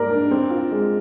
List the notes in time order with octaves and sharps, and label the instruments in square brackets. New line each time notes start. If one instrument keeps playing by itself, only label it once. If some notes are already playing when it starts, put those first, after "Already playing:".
Already playing: [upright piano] G#2 G3 A#3 [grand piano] A#4 D5
[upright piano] D4
C4
F4
G#3